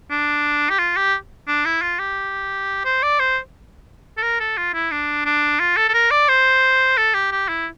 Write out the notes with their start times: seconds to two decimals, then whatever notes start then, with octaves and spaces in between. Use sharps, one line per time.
0.10 D4
0.69 G4
0.79 F4
0.96 G4
1.47 D4
1.65 E4
1.82 F4
1.99 G4
2.85 C5
3.03 D5
3.19 C5
4.17 A4
4.22 A#4
4.40 A4
4.57 F4
4.74 E4
4.91 D4
5.25 D4
5.60 F4
5.77 A4
5.89 A4
5.94 A#4
6.11 D5
6.28 C5
6.97 A4
7.14 G4
7.32 G4
7.49 E4